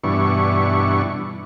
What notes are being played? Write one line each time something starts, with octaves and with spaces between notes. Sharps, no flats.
G2 B2 E3 D4 C#6